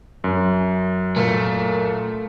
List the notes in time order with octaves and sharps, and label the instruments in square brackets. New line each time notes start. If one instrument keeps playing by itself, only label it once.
[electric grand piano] F#2
[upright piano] A#2 [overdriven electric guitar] A3